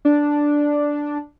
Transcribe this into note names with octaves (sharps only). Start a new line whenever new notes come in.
D4